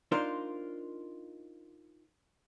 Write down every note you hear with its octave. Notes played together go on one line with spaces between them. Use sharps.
D4 D#4 F4 A#4 C5